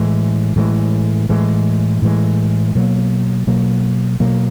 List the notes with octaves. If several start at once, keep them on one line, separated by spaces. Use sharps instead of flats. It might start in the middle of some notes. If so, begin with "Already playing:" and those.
Already playing: A2 E3 G#3
A2 E3 G#3
A2 E3 G#3
A2 E3 G#3
B2 F#3 A#3
B2 F#3 A#3
B2 F#3 A#3